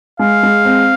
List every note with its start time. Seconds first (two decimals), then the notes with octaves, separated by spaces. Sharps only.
0.19 G#3 F5
0.43 G#3
0.65 C4